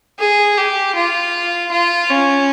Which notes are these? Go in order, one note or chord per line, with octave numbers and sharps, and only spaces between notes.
G#4
G4
F4
F4
C#4